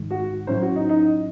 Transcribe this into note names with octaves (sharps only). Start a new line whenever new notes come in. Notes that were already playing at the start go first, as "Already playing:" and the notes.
Already playing: G#2 D#3 G#3
F#4
A2 F#3 C#4 E4 C5
F#4
D#4
D#4